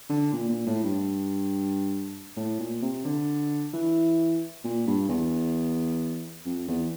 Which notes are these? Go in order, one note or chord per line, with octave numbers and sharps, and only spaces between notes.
D3
A#2
A#2
A2
G2
A2
A#2
C3
D3
E3
A#2
G2
E2
F2
E2